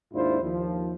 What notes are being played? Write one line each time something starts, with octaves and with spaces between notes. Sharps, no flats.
D#2 G#2 D4 E4 F4 C5
D#2 F3